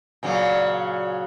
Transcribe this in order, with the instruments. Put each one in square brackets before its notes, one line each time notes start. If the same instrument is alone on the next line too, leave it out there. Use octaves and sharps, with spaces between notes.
[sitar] A#2 C#3 F#3